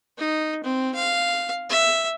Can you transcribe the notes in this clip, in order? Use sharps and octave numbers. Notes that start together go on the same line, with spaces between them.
D#4
C4
F5
E5